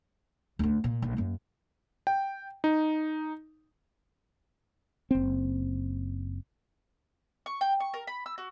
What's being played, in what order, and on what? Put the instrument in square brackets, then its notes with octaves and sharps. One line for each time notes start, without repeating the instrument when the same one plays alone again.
[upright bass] D2 D4
A#2
A#1
F#2 A#3
[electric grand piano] G5
D#4
[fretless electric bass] F#1 C4
[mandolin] C#6
G5
C#6
A#4
B5
E6
F#4